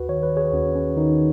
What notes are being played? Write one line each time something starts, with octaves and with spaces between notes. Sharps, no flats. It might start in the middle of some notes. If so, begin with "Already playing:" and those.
Already playing: D#2 F#4 B4
D#3 C#5
B4
G#4 C#5
D#2 C#4 F#4
C#4
D#3 D#4